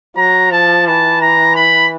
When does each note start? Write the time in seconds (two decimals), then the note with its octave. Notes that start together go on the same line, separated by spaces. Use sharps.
0.17 F#3 A#5
0.51 F3 A5
0.87 E3 A5
1.22 A#5
1.56 B5